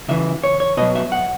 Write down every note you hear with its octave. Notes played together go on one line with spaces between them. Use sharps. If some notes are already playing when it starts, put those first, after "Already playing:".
C#3 E3 E5
C#5
C#5
B2 F#3 D#5
E5
F#5